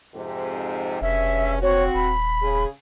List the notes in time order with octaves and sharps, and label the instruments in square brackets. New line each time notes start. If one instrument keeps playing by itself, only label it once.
[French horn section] F2 G#2 C3
[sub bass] F1 [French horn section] G2 C#3 C#4 [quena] E5
[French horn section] C4 F#4 [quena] C#5
[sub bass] D#1 [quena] B5
[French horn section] C#3 G#4